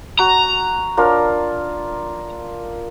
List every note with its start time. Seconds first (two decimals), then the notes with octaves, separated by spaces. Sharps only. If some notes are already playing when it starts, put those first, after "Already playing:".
0.19 F#4 A#5
0.97 D4 F4 A#4